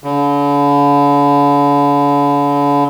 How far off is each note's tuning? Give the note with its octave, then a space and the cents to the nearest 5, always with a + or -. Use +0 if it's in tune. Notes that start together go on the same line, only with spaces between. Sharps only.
D3 -45